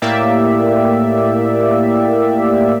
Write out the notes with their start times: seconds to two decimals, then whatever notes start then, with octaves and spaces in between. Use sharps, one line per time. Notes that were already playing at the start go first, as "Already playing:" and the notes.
0.02 A2 A#3 G4 D5 E5